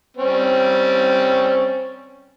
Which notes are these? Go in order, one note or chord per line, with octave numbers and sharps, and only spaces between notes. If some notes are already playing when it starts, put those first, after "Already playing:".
G3 C4 C#4